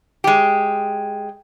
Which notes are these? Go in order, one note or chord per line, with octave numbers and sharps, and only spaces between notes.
G#3 G4